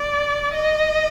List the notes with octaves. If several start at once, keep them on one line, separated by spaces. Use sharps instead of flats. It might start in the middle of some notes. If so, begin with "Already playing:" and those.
Already playing: D5
D#5